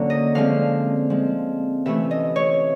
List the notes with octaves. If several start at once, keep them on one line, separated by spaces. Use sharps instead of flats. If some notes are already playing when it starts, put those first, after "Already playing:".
Already playing: D3 F#3 A#3 C#4
D#5
D3 F3 G#3 C4 F5
F3 G#3 C4
C3 E3 A3 C#4 E5
D#5
C#5